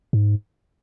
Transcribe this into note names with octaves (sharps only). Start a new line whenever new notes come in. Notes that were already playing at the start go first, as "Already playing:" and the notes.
G#2